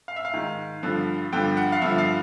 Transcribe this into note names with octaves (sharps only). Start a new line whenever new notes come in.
F5
E5
F5
G#2 D#3
G2 D3 F3
G2 D3 F3 G5
F#5
F5
G2 D3 F3 E5
F5